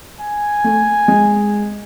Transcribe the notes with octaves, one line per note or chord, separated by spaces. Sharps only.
G#5
A3
G#3